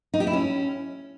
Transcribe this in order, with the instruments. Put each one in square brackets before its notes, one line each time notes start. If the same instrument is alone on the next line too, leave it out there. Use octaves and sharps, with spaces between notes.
[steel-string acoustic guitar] D#4
G4
E4
C#4